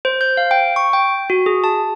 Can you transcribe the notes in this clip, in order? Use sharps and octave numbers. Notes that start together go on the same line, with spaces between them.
C5
G6
F5
G5
C#6
G5
F#4
G#4
A5